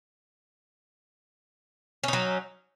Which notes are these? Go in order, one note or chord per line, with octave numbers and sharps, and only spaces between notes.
F#3 C#4 D#4